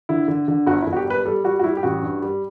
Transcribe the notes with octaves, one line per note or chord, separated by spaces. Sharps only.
D3 E4
D3
D3
G1 F#4
E4
G1
F#4
G4
G3 B4
G3 A4
G3 F#4
F#4
G3 E4
G4
A1 F#4
G2
G3